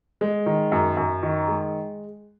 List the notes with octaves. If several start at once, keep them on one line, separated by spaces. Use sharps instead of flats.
G#3
D#3
F#2
F#2
D#3
G#3